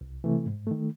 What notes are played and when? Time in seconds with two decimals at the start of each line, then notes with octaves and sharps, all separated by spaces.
0.01 C2
0.24 C3 E3 A3
0.46 G#2
0.67 D#3 A3